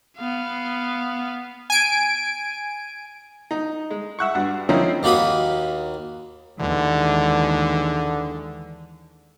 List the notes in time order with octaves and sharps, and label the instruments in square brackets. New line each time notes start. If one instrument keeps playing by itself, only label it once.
[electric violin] B3 F5
[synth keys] G#5 D7
[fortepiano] D#4
G#3
E5 F#5 C#6
G2 F#4
F3 A#3 C4 C#4 D#4 E4
[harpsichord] D#2 A#3 F#4 B5 D#6
[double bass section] D#2 E3 G#3 [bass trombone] D3